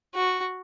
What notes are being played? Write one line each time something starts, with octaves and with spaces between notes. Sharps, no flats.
F#4